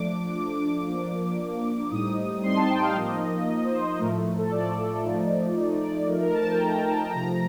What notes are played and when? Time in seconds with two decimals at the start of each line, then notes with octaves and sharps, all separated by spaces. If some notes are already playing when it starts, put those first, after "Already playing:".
Already playing: F3 A3 D4 D6
0.36 F3 A3 D4
0.87 F3 A#3 D4
1.39 F3 A#3 D4
1.91 A2 G3 C4 D#4 D#6
2.43 A2 G3 C4 D#4 C6
2.56 A5
2.69 G5
2.82 F5
2.95 F3 A#3 D#4 D#5
3.47 F3 A#3 D#4
3.65 C5
3.81 C5
3.99 A2 F3 A3 A#4
4.38 A4
4.51 A2 F3 A3 D5
5.03 F3 A3 D#4
5.55 F3 A3 D#4
5.81 D5
6.07 F3 A3 D#4 A#4
6.20 A#4
6.33 A5
6.46 G5
6.59 F3 A3 D#4 A#5
6.86 A5
7.11 C3 F3 A3 A#5